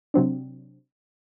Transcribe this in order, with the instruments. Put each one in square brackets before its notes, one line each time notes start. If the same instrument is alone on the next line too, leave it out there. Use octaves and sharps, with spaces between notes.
[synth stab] C3 F#3 C4 D4